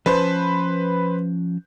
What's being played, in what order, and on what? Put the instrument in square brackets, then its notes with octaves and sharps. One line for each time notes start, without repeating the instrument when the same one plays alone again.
[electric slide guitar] F3 C#4 A5 [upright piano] B4 C5